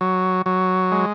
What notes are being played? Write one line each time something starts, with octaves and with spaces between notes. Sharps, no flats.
F#3
F#3
G#3